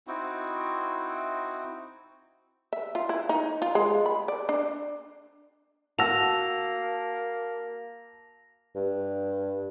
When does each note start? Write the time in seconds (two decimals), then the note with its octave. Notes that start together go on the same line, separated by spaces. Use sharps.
0.07 C4 D#4 E4 F#4
2.73 E5
2.95 F4
3.09 E4
3.29 D#4
3.62 F4
3.75 G#3
4.06 B5
4.28 D5
4.49 D4
5.99 A#3 F#4 A5 E6 A#6 F7
8.75 G2